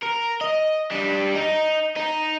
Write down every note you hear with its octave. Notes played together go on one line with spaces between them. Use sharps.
A#4
D#5
G3 D4
D#4
D#4